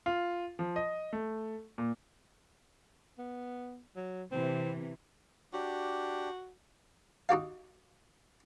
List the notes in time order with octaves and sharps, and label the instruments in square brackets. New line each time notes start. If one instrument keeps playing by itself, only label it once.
[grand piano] F4
F3
D#5
A3
A#2
[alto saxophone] B3
F#3
[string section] C3 E3 [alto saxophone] C4
[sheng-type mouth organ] D4 G4 [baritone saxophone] F#4
[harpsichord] D#4 F#4 G4 F5